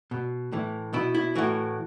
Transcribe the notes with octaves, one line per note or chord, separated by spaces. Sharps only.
B2
A2 E3
B2 E4
E4
A2 E3 F#4